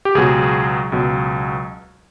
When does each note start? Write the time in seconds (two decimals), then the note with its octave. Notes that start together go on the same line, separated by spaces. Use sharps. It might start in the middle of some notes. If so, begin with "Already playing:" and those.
0.05 G4
0.15 C#2 B2 F#3 G#4
0.92 C#2 B2 F#3